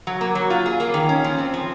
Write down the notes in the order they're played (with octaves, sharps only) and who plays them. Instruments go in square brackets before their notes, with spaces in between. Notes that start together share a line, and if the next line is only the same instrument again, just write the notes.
[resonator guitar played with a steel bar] F#3
A#3
F#3
F4
G#4
A#3
D#3
C#4
F3
C4
F3